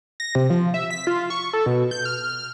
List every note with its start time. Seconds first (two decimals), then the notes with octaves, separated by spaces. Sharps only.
0.20 A#6
0.35 C3
0.50 F3
0.74 E5
0.91 B6
1.07 F4
1.30 C#6
1.53 A4
1.66 B2
1.91 G6
2.05 F6